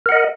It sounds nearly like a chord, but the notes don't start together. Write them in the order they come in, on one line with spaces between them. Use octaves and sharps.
A#4 F#5 D#5